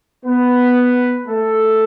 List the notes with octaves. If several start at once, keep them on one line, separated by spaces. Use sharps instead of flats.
B3 B4
A3 A4